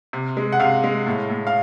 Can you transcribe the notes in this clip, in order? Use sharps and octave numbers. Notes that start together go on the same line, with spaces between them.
C3
G#3
F#5
C3 F5
G#3
A2
A2
F5